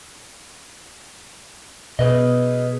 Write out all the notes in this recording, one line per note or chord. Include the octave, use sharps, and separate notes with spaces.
B2 G#4 B4 D#5